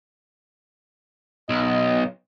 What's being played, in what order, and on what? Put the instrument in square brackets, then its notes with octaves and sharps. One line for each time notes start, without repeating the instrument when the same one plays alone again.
[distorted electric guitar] B1 [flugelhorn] D#5